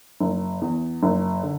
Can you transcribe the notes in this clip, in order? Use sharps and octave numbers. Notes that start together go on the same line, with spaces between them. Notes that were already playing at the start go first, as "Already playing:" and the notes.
F#1
E2
F#1
D3